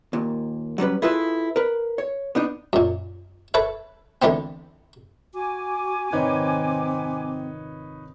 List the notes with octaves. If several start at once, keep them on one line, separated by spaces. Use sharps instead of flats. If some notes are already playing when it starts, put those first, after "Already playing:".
D#2 A#2
F#3 G3 C#4 B4
E4 F4 G#4 A4 B4 E5
A#4 B4
C#5
B3 D4 D#4
F#2 A#2
A4 B4 C#5 E5
D3 E3 A3 B3 C4
F#4 G#5 D6
F1 G#2 D#3 C4 D#4 B4 C#5